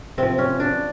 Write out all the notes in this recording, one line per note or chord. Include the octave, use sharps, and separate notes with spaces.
C3 F3 C4
C#4
D4